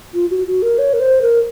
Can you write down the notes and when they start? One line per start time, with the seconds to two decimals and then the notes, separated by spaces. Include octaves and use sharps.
0.14 F4
0.30 F#4
0.46 F#4
0.62 A#4
0.79 C#5
0.93 A#4
1.00 C5
1.22 A#4